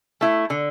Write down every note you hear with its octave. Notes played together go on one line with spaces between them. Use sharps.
A3 E4
D3